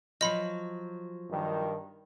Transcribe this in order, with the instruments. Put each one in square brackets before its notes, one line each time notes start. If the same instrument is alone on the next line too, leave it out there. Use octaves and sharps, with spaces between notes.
[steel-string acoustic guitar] F3 F#3 [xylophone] D#5 B5
[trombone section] G2 D#3